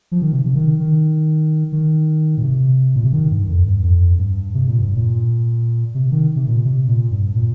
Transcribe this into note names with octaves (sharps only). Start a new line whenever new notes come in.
F3
D#3
C3
C3
D#3
D#3
D#3
A#2
C3
A#2
C3
D#3
G2
F2
G2
F2
G2
C3
A#2
G2
A#2
C3
D#3
C3
A#2
C3
A#2
G2
A#2